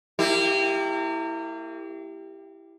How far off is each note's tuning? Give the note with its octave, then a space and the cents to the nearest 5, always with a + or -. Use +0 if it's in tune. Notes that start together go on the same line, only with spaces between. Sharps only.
A#3 -35 E4 +0 G4 +0